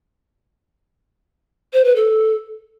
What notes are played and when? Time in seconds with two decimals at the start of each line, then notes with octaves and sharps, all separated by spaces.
1.73 C5
1.84 B4
1.96 A4